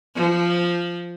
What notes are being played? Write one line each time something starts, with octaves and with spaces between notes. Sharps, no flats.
F3